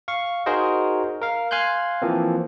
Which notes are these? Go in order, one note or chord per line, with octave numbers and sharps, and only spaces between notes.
F5 C#6
D#4 F#4 G#4 A#4 C5 D#5
A#4 F5
F5 G#5 C6 F#6 G6
E3 F3 A#3 C4